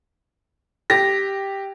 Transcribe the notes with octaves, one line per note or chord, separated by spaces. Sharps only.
G4 A#6